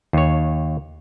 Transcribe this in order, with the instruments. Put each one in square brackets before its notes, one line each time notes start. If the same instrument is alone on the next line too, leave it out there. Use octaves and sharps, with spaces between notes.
[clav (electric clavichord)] D#2 C#5